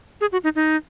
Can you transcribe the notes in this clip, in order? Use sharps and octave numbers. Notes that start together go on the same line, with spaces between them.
G#4
F#4
D#4
D#4